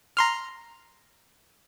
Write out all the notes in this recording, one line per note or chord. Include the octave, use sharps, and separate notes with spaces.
A#5 C6 F6